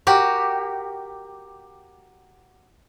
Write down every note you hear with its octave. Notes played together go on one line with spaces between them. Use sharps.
F#4 G4 A#4